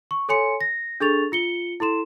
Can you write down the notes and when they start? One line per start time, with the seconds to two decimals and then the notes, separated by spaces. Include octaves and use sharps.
0.11 C#6
0.29 A4 C#5 G#5 C6 C#7
0.61 A#6
1.00 D4 G#4 A4 C#6 A6 F7
1.32 F4 C#7 G7
1.80 E4 A4 C6 E7